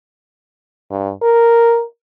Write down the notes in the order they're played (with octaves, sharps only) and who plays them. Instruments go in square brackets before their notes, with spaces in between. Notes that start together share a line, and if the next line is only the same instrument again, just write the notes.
[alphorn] G2
A#4